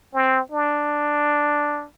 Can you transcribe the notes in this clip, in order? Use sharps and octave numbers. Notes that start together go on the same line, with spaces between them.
C4
D4